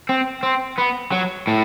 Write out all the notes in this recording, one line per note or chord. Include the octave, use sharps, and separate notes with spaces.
C4
C4
B3
F#3
A2